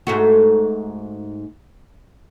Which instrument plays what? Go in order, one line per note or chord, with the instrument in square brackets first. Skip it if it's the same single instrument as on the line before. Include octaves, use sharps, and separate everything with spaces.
[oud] G#2 A3 F#4